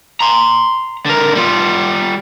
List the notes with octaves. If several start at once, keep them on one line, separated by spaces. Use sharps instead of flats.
A#5 C6
D3 A#4
G3 F4